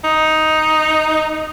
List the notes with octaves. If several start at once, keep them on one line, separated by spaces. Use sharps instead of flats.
D#4